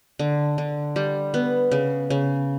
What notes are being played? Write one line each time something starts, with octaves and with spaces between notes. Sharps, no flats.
D3
D3
G3
B3
C#3
C#3